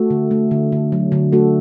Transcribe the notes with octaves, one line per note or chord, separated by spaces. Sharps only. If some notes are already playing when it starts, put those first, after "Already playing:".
Already playing: A3 F#4 A4
D3
A3
D3
D3
F#3
D3
A3 F#4 A4